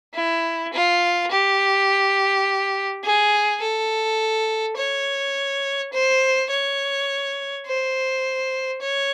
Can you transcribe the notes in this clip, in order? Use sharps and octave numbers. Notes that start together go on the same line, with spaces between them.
E4
F4
G4
G#4
A4
C#5
C5
C#5
C5
C#5